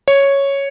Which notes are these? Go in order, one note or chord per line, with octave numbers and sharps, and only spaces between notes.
C#5